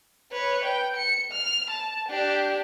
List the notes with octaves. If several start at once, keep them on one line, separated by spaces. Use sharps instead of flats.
B4 C#5
G5
C#7
F6
A5
D4 G4